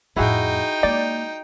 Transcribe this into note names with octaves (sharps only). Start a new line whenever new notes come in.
F2 A2 D#4 E4 F#4 G#4 G5
G#3 A#3 D5